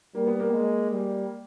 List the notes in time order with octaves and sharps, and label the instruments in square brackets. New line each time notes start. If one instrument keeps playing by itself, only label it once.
[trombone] G3 [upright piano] A#3
[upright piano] B3
A#3
[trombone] G#3
G3